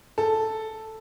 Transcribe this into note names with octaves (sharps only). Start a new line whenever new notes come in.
A4